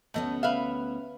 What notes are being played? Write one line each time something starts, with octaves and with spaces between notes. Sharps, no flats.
D2 A3 B3 C#4 D#5
B4 E5 F5